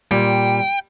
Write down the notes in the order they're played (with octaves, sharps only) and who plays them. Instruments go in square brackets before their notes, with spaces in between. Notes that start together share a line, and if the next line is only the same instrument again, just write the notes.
[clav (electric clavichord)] A#2 [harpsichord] G3 [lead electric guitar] G5